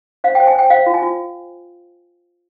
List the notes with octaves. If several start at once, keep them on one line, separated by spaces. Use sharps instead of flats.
C5 F5
G5
C5
G#5
C5 G5
C5 F5
F4
G#5
F4